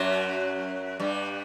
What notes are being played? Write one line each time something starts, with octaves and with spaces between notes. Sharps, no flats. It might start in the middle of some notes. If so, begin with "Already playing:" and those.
Already playing: F#2 F#3
G2 G3